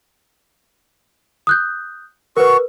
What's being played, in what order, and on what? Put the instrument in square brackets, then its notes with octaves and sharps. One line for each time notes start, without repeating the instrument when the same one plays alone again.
[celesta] D#6 F#6 G6
[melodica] F#4 C#6 [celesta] A#4 B4